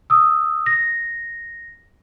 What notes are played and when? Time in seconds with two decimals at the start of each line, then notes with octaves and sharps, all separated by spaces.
0.10 D#6 E6
0.66 A#6